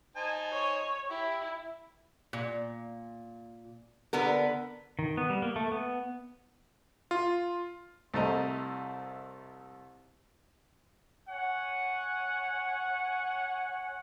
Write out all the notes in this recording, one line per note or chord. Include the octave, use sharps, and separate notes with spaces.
D#4 C5 G#5 A5
C#5
E4 G4
A#2
D3 B3 A#4
D#3
B3
G3
A#3
A3
B3
F4
C2 A3 C5 D#5 A#5
C#5 F#5 G#5